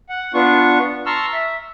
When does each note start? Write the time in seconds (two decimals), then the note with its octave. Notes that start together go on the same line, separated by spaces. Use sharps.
0.09 F#5
0.34 B3 D4 F4 C#6
1.06 A5 A#5 C6 C#6 E6 F6
1.33 E5